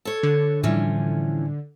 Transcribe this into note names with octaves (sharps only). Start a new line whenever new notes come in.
A4 C#5
D3
A2 E3 F3 G3 C#4